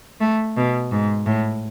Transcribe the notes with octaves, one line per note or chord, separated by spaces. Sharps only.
A3
B2
G#2
A2